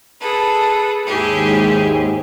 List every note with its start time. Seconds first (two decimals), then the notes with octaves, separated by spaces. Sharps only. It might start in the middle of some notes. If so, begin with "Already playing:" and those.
0.20 G#4 A4 B4
1.07 D#2 G#2 E4 G4 G#4